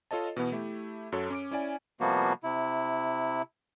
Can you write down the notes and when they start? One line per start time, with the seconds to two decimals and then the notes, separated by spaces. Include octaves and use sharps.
0.11 F4 A4 C#5 D#5 A5
0.37 B2 E3 B3
0.52 A3 E4 G4
1.12 F#2 F#4 A4 C#5
1.30 C#4 D6 D7
1.51 C#4 E4 D5 G#5
2.00 C3 F3 G3 A#3 B3 F#4
2.44 C3 E4